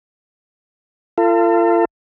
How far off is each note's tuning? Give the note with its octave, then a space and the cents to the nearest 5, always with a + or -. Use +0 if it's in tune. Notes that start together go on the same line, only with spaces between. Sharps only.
F4 -35 A4 +35